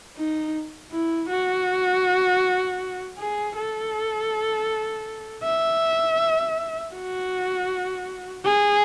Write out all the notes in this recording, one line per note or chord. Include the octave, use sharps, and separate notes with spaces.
D#4
E4
F#4
G#4
A4
E5
F#4
G#4